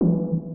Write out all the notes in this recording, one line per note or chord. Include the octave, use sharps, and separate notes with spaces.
E3